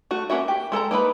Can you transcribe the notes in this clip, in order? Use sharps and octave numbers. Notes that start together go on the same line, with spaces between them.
A3 F#4
A#3 C#4 F#4 E5
G4
G#3 A4 A5 A#5
A#3 D#4 B4 B5